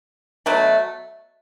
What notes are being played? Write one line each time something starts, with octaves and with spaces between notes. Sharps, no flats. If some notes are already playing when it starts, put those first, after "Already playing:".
B2 F#3 A3